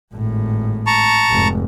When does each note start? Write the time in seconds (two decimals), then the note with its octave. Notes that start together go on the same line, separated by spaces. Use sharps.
0.14 G#1 A2
0.87 A5 A#5 C#6
1.30 F1 G#2